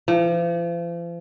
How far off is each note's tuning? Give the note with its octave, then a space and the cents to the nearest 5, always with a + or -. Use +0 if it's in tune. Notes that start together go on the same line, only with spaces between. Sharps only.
F3 -40